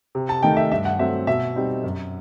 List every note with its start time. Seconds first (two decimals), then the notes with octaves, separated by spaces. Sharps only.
0.15 C3
0.29 A5
0.42 D#3 A3 D#4 G5
0.57 E5
0.72 G2 E5
0.85 F#5
0.99 F#3 A3 C4 E5
1.27 B2 E5
1.56 G3 C4 D#4
1.84 F#2